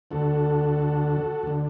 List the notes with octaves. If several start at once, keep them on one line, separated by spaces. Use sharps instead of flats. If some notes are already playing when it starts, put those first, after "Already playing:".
D2 D3 F#4 A4
D2 D3